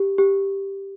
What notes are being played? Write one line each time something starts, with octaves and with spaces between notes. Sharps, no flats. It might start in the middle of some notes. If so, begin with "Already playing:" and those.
Already playing: G4
G4